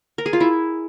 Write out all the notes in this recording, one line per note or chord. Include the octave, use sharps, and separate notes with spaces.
A#4
G#4
F4
E4